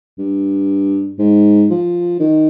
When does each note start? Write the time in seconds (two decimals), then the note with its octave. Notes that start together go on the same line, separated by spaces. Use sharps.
0.19 G2
1.19 G#2
1.70 F3
2.20 D#3